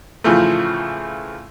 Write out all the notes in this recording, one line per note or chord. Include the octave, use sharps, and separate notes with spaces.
A2 C#3 E3 F3 A3